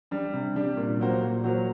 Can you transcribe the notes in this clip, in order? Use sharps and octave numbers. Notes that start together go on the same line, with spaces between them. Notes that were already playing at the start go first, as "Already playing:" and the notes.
G3 D4 G4
C3
G3 D4 G4
A#2
F#3 A#3 F#4 C5
A#2
F#3 A#3 F#4 C5